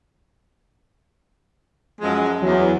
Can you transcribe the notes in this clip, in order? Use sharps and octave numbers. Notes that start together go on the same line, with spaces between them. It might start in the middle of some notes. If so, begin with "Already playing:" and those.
F#2 F3 G#3
E2 F#3